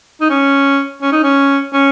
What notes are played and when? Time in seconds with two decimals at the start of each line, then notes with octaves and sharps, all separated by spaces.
0.21 D#4
0.30 C#4
1.02 C#4
1.12 D#4
1.23 C#4
1.73 C#4